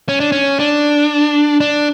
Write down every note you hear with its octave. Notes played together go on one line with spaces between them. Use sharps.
C#4
D4
C#4
D4
D4